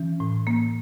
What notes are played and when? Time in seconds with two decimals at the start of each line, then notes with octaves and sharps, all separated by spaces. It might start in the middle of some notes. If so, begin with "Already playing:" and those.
Already playing: E3 C#4
0.20 A2
0.47 A#3